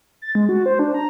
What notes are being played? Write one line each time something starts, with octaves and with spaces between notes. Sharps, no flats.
A6
G#3
F#4
C5
D4
A#5